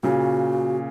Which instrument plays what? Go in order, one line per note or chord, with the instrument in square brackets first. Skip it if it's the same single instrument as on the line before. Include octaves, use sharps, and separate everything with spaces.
[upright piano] A#2 C#3 [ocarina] F#4